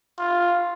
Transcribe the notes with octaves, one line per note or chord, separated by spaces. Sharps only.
F4